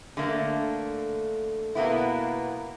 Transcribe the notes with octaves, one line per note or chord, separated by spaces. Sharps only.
D3 A3 A#3
B2 A#3 B3 E4